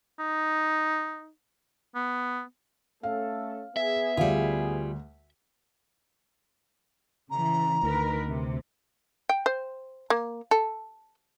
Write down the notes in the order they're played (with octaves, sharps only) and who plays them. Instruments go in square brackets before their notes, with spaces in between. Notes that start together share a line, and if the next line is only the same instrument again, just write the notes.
[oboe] D#4
B3
[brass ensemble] A3 C#4 A4 [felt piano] F5
[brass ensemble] B3 G#4 [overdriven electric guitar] E5
[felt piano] D2 [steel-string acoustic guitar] G3 F4
[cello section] C#3 E3 [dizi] A#5
[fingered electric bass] D2 [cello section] D#3 A#4 B4
[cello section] C3
[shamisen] G5
C5
A#3
A4